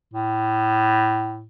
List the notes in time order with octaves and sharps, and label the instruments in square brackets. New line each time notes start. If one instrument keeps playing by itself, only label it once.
[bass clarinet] A2